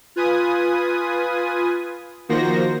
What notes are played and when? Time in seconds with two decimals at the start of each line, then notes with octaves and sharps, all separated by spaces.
0.16 F4 B4 G#5 D#6
2.29 D#3 F3 A#3 F#4 C5 A#6